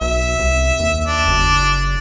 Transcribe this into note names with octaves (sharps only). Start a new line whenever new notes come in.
B1 E5
C2
D#2
D4
F#1